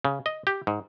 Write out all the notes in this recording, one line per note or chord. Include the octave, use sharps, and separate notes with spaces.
C#3
D#5
G4
G#2